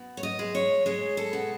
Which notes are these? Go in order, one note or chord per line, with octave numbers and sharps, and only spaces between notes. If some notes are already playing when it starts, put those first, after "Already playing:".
Already playing: B2
C#5
D#5
G#3
C#5
G#3 C#5
A4
B2